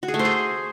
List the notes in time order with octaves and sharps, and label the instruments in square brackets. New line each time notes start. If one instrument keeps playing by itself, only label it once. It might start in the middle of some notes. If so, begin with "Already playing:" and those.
[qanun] F#4
G#4
A3
C5
G#4